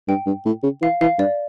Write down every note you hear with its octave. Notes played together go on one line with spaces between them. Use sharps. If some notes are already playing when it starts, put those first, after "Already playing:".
G2 G5
G2
A2
C#3
E3 F5
E3 F5
G2 D5